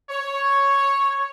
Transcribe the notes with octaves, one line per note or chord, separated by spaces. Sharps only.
C#5